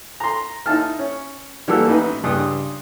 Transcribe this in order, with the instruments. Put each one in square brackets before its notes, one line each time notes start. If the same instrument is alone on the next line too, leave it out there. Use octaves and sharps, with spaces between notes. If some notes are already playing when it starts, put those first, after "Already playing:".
[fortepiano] A#5 C6
D#4 E4 A5 F6
C#4
E3 G3 A#3 F#4 A4 E6
A1 D#4 B4
C#2 G2 D#6